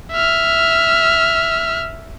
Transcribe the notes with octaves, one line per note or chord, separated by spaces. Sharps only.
E5 F6